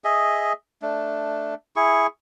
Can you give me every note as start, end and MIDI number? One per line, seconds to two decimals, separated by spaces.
0.04 0.53 68
0.04 0.53 75
0.04 0.53 76
0.82 1.55 57
0.82 1.55 62
1.76 2.07 64
1.76 2.07 68
1.76 2.07 85